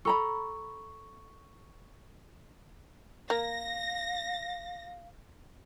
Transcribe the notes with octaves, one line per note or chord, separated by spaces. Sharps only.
A4 A#5 B5 C#6
A#3 F5 A#6